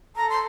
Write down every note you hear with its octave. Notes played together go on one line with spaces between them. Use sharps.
A4 A#5
C6